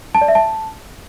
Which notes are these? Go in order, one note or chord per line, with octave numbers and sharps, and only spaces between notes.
A5
D5
E5
A5